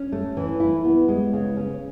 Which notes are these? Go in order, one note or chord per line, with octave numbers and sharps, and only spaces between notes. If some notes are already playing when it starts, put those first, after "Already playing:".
Already playing: C#4
A3
E3
E4
B3
G#3
C#3
C#4